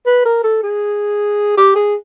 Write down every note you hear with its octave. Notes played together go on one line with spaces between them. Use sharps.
B4
A#4
A4
G#4
G4
G#4